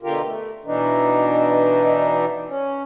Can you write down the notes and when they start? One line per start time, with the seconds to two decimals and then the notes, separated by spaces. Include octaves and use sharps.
0.03 B2 D3 F4 G4 A#4
0.23 A3
0.65 B2 E3 D4 D#4
2.49 C#4